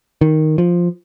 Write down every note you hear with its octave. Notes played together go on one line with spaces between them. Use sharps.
D#3
F3